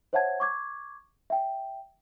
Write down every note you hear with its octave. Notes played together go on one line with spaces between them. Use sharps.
C5 C#5 E5 F#5 A5 G#6
C#6 D6 G#6
E5 G5